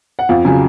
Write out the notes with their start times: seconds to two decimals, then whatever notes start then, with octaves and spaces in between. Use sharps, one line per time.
0.19 F#5
0.29 F2 F5
0.45 C#3 F#3 G#5